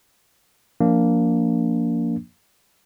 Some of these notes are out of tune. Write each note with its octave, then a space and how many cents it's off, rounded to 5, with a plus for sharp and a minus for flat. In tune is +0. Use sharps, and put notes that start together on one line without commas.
F3 +0 A#3 +0 D4 -20